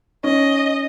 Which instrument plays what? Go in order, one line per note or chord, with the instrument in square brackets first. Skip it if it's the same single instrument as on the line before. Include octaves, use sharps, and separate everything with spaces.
[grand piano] C#4 [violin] D#5